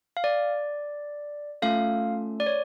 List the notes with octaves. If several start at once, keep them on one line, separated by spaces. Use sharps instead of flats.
F5
D5
A3 C#4 F4 A4 F5
D5
C#5